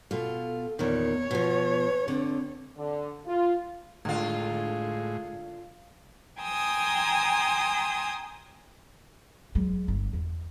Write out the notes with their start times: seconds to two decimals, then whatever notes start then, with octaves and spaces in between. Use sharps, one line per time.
0.11 B2 F4 A4
0.79 E2 A#2 D#3 B3 C#5
1.31 B2 F3 B4
2.08 D3 C4 A4
2.77 D3
3.26 F4
4.05 A2 D3 G#3 F4
6.41 G5 G#5 A#5 C6 D#6 E6
9.55 F#3 G#3
9.88 G1
10.13 E2